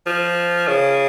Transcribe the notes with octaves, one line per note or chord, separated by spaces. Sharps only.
F3
C#3